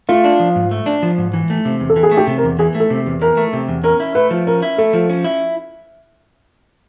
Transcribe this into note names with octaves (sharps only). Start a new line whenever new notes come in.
A3 F4
D4
F3
G#2
A3
D4
F3
G#2
E3
A3
C3
E2
A4
E3
G#4
A3
G4
C3
A#4
E2
E3 G#4
A3
A4
C3
E2
E3 A#4
A3
C3
E2
C#4 A#4
E4
A3 B4
F3
C#4 A#4
E4
A3 A4
F3
C#4
E4